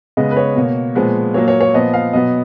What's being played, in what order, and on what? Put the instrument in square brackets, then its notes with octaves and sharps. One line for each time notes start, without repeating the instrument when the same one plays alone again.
[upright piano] C#3 G#3 B3 D#5
B4
C#5
B2 A#3
A#2 F3 G#3 B3
A#2 F#3 A#3 C#5
C#5
C#5
A#2 F3 B3 D#5
F5
B2 F#3 B3 D#5